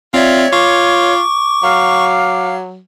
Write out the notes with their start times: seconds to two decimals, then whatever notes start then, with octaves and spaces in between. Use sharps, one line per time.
0.14 C4 F4 C#5 D5 E5
0.53 F4 C#6 D6
1.63 F#3 F5